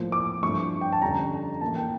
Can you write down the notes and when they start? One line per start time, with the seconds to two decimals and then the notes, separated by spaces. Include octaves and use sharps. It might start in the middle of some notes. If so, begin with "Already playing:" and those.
Already playing: A2 F3 A#3
0.12 D6
0.43 G2 F3 A3 E4 C#6
0.81 G5
0.92 A5
1.02 F2 D3 G3 C#4 A#5
1.61 A2 E3 A#3 E4 A5
1.76 G5